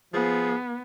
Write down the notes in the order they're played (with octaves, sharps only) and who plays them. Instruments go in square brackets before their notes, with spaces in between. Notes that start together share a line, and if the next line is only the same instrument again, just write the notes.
[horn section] F3 G#4 [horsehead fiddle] B3